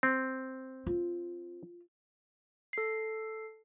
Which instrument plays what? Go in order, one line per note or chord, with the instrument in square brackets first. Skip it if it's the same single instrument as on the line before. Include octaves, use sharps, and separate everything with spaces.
[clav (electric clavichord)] C4
[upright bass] F4
[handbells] A4 C7